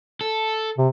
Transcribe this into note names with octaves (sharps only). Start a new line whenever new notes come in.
A4
C3